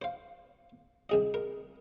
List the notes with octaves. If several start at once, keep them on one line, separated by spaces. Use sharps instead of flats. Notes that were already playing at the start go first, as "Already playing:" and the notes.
C5 F5
C2 G#4 D#5
A#4